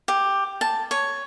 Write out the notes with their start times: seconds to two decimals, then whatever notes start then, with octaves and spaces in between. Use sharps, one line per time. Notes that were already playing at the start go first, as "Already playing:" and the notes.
0.08 G4
0.61 A5
0.91 C#5